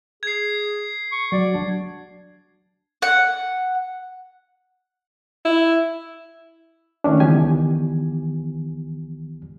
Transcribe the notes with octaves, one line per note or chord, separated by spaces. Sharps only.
G#4 G#6 C7
C#6
F#3 D5
D4
F#5
E4
D#3 A3 C#4 D4
C#2 D#3 E3 B3 G4 G#5